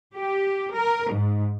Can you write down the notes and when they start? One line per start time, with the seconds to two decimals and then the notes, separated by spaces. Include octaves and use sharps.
0.16 G4
0.75 A#4
1.13 G#2